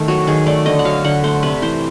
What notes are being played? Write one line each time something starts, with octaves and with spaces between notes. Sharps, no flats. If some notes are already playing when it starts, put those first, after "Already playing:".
Already playing: D#3 A3
F#3 F#4
D#3 G#4
A3 D5
D3 D#5
F#5
F#3 F5
D3 F#5
A3 C5
C3 B4
E3 C5